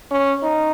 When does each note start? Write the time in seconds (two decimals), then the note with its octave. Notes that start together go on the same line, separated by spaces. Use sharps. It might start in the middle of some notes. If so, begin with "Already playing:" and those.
0.11 C#4
0.43 D#4